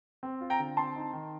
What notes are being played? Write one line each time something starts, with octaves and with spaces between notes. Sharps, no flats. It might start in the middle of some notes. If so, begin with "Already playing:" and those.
C4
F4
G5 A#5
D3
C4 A5 C6
D#4
D#3